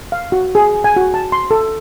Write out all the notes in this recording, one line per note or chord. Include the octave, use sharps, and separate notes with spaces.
F5
F#4
G#4
G#5
F#4
A5
C6
A4